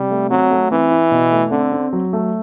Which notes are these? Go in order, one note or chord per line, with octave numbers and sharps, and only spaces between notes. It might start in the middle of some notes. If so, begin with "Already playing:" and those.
Already playing: C3 G3
A3
F#3 C4
A3
E3 C4
E4
B2
A3
D3 C4
C4
F#3
A3